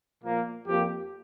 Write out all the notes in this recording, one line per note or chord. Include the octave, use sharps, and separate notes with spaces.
A#2 F3 A#3
F2 F3 A#3 G4